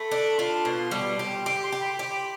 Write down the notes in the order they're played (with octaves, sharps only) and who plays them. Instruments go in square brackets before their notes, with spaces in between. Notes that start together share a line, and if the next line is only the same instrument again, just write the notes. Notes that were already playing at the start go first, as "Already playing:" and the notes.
Already playing: [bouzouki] A3 [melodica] B5
[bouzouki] D4
[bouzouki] F4 [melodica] C6
[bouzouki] B2
G3
G4
[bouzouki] G4 [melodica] C6
[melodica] C6
[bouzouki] G4
[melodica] B5
[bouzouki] G4